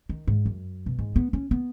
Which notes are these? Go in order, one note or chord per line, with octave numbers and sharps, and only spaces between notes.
D#3
G#2
F#2
B2
G#2
B3
C#4
B3